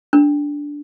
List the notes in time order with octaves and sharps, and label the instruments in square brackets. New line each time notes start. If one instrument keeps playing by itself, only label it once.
[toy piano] D4